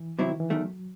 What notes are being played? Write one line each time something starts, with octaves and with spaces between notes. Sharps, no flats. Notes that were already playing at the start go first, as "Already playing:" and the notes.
Already playing: E3
C3 F#3 C4 E4
D#3
E3
E2 D#3 F#3 A3